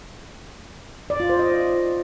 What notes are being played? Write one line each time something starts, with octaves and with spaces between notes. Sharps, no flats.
D5
F4
C5
D#5